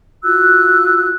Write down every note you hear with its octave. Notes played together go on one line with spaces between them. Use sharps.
F4 F#4 E6 F#6